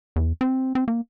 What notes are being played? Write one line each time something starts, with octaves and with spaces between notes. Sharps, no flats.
E2
C4
C4
A#3